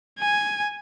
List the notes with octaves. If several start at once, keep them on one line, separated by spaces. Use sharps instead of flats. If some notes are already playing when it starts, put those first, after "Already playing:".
G#5